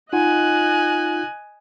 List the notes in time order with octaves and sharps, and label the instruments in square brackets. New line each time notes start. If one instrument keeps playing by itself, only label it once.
[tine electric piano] D#4 F4 F#5 [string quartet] D#5 G#5 F#6